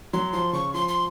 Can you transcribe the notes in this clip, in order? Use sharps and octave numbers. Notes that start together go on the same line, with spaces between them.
F#3 C6
F3 C6
C#3 C#6
F3 C6
C6